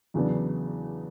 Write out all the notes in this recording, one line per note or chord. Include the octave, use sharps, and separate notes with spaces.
E2 C#3 F#3 B3 D4